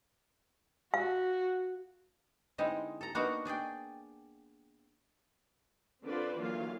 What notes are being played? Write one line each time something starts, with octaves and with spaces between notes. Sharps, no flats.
F#4 F5
D3 G#3 C4 D#4 E4
A4 A#5
A#3 B3 D4 D#4 F#4 F#5
D4 G#4 D5 G5
D3 C4 F4 B4 C5 D5
D3 E3 F#3 A#3 F4 F5